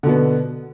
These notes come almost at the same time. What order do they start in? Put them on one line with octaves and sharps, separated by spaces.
D3 B2 B3